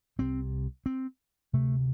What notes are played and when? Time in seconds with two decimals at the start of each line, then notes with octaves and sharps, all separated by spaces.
0.19 C2 C3 C4
0.86 C4
1.53 D2 C3 A3